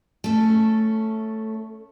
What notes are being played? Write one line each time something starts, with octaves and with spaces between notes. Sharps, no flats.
A3 C#4